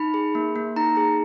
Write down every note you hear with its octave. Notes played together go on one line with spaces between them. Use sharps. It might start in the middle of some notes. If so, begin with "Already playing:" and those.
Already playing: D#4 B5
G#4
A#3
A#3
D#4 A#5
G#4